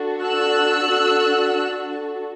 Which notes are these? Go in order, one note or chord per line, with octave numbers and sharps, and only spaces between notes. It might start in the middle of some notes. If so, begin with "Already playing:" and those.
Already playing: D4 F#4 A4
E6 F#6